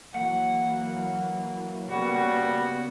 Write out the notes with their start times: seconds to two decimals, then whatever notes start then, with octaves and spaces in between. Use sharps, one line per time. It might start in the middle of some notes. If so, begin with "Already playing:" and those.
0.15 E3 F#3 A#3 F#5
1.90 C#3 G3 A#3 B3 F#4